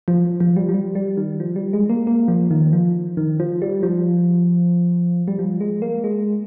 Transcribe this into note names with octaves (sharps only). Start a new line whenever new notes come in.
F3
F3
G3
F3
G3
G3
D#3
F3
G3
G#3
A#3
A#3
F3
D#3
F3
D#3
F3
G3
F3
G3
F3
G#3
A#3
G#3